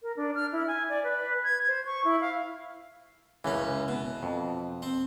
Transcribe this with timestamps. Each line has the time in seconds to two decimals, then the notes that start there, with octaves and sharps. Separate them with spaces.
0.03 A#4
0.17 D4
0.35 F6
0.52 E4
0.67 G#5
0.89 D5
1.04 B4
1.44 G#6
1.67 C5
1.86 C#6
2.04 E4
2.21 F5
3.44 C#2 F#2 E3 C#4
3.88 B2
4.23 F2
4.82 C4